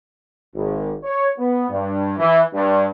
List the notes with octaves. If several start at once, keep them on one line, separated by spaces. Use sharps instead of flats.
G#1
C#5
B3
G2
E3
G2